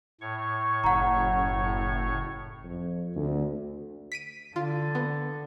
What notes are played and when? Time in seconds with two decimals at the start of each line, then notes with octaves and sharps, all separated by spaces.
0.21 A2 C#5 C#6
0.84 F#1 F#5 A#5
2.64 F2
3.16 D2
4.12 B6 D7 D#7
4.56 D3 F4
4.95 B3